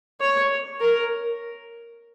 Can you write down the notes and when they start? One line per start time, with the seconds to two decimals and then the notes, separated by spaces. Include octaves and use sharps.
0.20 C#5
0.80 A#4